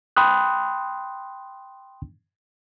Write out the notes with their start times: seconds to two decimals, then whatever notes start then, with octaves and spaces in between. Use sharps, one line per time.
0.17 G5 B5 C6 D#6 F#6